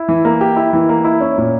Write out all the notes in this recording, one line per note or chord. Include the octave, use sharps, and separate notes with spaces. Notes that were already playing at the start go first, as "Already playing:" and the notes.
Already playing: E4
E3
A#3
G4
E4
E3
A#3
E4
C#4
A#2